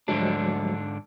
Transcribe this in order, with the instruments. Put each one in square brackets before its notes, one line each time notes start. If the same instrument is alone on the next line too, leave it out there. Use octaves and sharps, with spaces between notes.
[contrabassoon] D2 [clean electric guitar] G#2 D3 D4 [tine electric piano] F3 F#3 G#3